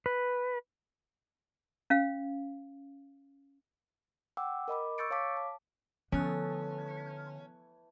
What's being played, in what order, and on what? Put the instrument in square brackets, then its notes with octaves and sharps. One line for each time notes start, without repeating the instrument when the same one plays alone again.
[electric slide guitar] B4
[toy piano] C#4 F5
[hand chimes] F#5 G5 D6 E6
A#4 D#5 B5 D6
C#6 E6 G6 A6 C#7 D7
C#5 F5 A5 D6 B6
A5
[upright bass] D3 [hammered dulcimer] E3 A3 [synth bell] F3 B3 F#6 [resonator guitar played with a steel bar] C#4